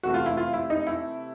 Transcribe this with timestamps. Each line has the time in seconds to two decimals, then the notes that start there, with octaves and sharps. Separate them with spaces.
0.03 C3 E3 A3 F#4
0.14 F4
0.26 E4
0.37 F4
0.53 E4
0.70 D#4
0.87 E4